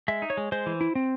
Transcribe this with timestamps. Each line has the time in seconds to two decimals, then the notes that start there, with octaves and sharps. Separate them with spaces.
0.08 G#3 E5
0.22 D#4
0.30 C#5
0.37 G#3
0.52 G#3 C5
0.66 E3
0.81 E4
0.95 C4